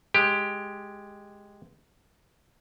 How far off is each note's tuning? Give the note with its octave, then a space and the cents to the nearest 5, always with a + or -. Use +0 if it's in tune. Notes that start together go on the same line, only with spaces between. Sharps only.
G#3 +0 G4 +10